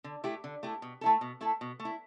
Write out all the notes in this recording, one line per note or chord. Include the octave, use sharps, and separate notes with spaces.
D3
A3 E4 G4
D3
A3 E4 G4
B2
A3 E4 A4
B2
A3 E4 A4
B2
A3
E4